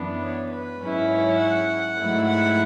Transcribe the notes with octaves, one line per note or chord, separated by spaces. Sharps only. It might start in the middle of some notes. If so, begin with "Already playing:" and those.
Already playing: F#2 E3 B3 D4
C#5
B4
G#2 F#3 C#4 E4
C#5
F#5
G#2 F#3 A3 E4
F#5